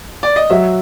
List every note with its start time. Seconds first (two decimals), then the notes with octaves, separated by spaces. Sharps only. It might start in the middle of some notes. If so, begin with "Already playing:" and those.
0.23 D5
0.36 D#5
0.50 F#3 E5